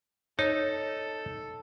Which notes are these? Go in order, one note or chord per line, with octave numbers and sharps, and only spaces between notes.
D#4 A4 C#5